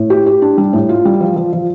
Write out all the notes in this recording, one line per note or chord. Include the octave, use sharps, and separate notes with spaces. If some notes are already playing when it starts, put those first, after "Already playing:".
Already playing: A2
G4
G4
D4
G3
A2
F4
G3
F3
F3
F3